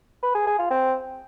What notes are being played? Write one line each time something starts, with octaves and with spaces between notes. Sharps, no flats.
B4
G#4
G#4
F4
C4